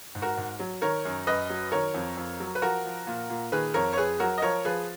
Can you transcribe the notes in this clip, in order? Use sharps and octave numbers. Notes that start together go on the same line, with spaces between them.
G#2
F#4 A#4
G#2
F#3
D#3 A#4 C#5
F#2
F#2 B4 D#5
F#3
D#3 A#4 C#5
F2
F2
F#3
B4
F3 F#4 A#4
F3
A#2
A#2
D#3 G#4 B4
F2 A#4 C#5
C#5
F2 G#4 B4
F#3 F#4 A#4
D#5
F3 A#4 C#5
F3 G#4 B4